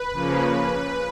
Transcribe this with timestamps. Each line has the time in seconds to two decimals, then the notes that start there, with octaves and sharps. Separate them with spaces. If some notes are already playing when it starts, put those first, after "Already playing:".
Already playing: B4
0.12 C#3 F3 A#3 C#4